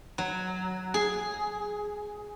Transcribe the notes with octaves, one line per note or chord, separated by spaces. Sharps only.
F#3
G#4